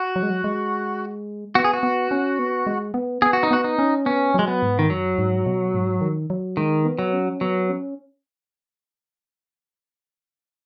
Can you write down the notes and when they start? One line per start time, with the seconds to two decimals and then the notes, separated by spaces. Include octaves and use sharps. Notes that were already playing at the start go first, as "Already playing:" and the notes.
Already playing: F#4
0.16 F#3
0.23 G#3
0.30 F#3
0.44 G#3
1.55 B3 F#4
1.64 G#4
1.73 F#4
1.83 B3
2.11 C#4
2.39 B3
2.67 G#3
2.94 B3
3.22 B3 G#4
3.33 F#4
3.43 D#4
3.51 B3 F#4
3.64 D#4
3.79 C#4
4.06 B3 C#4
4.34 F#3 G#3
4.47 B3
4.63 G#2
4.79 D#3
4.90 F#2 F#3
5.18 G#2
5.46 B2
5.74 G#2
6.01 D#3
6.30 F#3
6.57 D#3 G#3
6.85 B3
6.99 F#3
7.13 C#4
7.41 F#3 B3
7.69 C#4